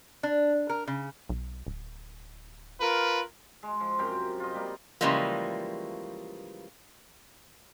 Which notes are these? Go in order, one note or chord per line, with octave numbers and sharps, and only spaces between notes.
D4
A#4
C#3
B1
D1
F4 A#4 B4
G#3
F3
F#2 C3 G5 A#5
F4 D#5
G3 A#3
C#3 E3 F3 G3 G#3 A#3